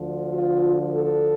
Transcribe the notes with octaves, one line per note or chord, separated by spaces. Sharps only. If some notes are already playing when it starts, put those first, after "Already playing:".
Already playing: D2 D3 F3
F4
A4